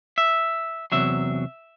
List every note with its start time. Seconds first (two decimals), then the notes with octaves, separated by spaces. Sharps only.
0.18 E5
0.92 E2 C3 F#3 E5